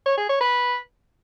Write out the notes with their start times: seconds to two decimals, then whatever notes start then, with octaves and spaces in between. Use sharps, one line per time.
0.06 C#5
0.18 G#4
0.29 C#5
0.41 B4